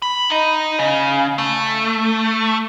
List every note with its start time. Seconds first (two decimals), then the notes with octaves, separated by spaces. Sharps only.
0.02 B5
0.29 D#4 D#5
0.79 C#3
1.38 A3